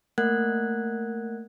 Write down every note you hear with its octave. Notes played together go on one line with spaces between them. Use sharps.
A3 A#3 A#4 F#5 F#6 G#6